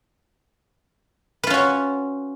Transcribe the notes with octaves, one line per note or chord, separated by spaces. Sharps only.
C#4 F4 F#4 B4